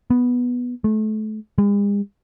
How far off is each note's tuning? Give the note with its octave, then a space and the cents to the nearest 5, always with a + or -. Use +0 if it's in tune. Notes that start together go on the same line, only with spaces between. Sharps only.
B3 -5
A3 -30
G#3 -45